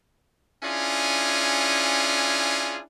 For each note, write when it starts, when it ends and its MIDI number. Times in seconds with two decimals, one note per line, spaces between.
0.63 2.80 61
0.63 2.80 62
0.63 2.80 64
0.63 2.80 65
0.63 2.80 68